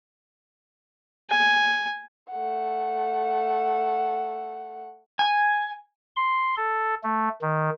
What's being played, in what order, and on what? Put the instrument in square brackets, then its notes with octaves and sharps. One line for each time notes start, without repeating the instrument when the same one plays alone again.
[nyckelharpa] G#5
[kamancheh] A3 F#5
[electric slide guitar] G#5
[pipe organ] C6
A4
A3
D#3